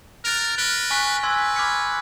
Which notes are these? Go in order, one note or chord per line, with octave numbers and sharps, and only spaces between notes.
A#4 F#6 A6 D7 F7
B4 F6 A#6 D7 G7
G#5 C#6 F#6 B6
B4 G#5 C6 E6 G#6
B5 D6 F6 G#6 C#7